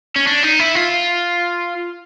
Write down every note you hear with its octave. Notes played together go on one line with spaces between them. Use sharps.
C#4
D4
D#4
E4
F4